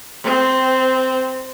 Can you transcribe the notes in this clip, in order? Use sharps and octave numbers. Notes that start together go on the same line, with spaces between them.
C4